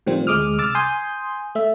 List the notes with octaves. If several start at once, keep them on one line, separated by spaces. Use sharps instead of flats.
A2 D#3 F3 G3 C4
D2 G#3 D6 D#6 F6
C2 D6 E6 F6 A6
G#5 C6 D#6 G6
A3 E5